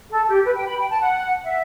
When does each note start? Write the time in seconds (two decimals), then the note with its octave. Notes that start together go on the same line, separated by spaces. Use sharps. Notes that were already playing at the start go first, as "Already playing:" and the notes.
0.11 A4
0.27 G4
0.44 B4
0.55 G5
0.67 B5
0.78 G5
0.89 A5
0.99 F#5
1.44 E5